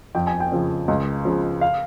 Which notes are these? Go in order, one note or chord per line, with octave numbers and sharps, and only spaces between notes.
F2 G5
G#5
G5
C#3 F3
C#2
C#3 F3
F5